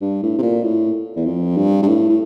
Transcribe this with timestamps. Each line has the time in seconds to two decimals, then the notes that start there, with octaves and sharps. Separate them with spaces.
0.01 G2
0.23 A2
0.38 C3
0.42 A#2
0.64 A2
1.16 E2
1.26 F2
1.57 G2
1.83 G2
1.88 A2
2.09 A2